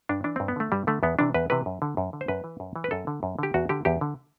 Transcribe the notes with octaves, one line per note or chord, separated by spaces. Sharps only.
G2 D4
E3 D4
G2 C4
B3
D3 A3
G2 G3
D3 A3
E2 B3
C3 E3 D4
E2 B4
C3 E3 B4
F#2
D3
F#2
D3
C5
F#2 B4
E3
F#2
E3
B4
F#2 A4
D3
F#2
D3 G4
E2 F#4
D3 G4
E2 G4
D3